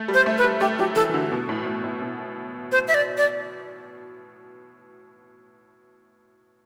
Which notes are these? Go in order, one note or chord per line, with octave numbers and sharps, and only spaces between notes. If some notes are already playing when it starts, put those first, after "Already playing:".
Already playing: A3
G3
C5
A3
B4
G3
A3 G4
F#3 G4
E3 A4
E3
D3
B2
A2
A2
A2
B2
C5
E5
D5
D5